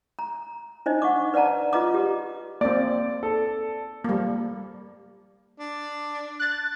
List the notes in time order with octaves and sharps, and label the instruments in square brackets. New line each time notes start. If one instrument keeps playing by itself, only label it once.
[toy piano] A#5
D4 D#4 C5 D#5
D#5 F#5 C#6 D6
B4 D5 F#5 A5 A#5
F4 B4 D#5 A#5 D6
G4
[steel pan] A#3 C4 [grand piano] D5
[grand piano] A4
[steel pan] G3 A#3
[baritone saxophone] D4
[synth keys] F#6 A6